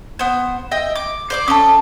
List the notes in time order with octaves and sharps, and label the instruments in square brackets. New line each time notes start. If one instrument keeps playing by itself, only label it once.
[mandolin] B3 C5
D#5 E5 G5
D6
C5 D5 D6
[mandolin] C#4 A4 [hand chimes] A5 D#6